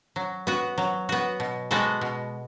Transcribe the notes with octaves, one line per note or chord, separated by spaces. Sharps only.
F#3
B3 F#4
F#3
B3 F#4
B2
G#3 B3 F#4 A4
B2